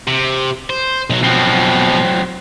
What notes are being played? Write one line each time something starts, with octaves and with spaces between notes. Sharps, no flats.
C3
C5
B1 F#3
B2 F3 F#3 C4